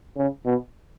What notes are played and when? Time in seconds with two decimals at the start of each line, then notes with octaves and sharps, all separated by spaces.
0.17 C#3
0.46 B2